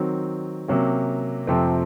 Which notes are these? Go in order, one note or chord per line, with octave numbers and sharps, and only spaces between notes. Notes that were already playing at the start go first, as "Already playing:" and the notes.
Already playing: D#3 F#3 C4
C3 F#3 A#3 C#4
F2 C3 F3 A3 C4